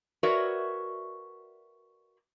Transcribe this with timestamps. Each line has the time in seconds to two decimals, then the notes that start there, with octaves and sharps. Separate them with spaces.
0.23 F#4 A#4 B4 C#5 D5 E5